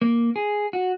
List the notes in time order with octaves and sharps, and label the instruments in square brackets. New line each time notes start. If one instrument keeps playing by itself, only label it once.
[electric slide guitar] A#3
G#4
F#4